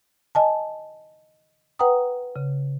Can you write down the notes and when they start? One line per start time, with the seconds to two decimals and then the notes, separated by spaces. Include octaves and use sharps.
0.35 D#5 G#5 A5
1.79 B4 F#5 G5 A#5 D#6
2.36 C#3